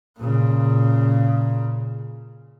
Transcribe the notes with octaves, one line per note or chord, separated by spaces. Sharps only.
A#2 C#3